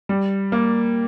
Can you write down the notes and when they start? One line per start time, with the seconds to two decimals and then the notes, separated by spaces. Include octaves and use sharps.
0.09 G3
0.52 A#3